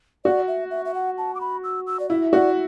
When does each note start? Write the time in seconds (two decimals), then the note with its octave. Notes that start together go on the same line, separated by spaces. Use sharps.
0.25 F#4 D5
0.48 E5
0.71 E5
0.85 E5
0.94 F#5
1.18 A5
1.35 D6
1.41 B5
1.64 E6
1.87 E6
2.00 D5
2.09 E4 E5
2.33 F#4 D5